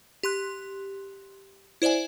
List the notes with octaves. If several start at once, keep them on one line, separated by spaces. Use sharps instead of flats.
G4 C6 F#6
E4 C5 D5 E5 G#5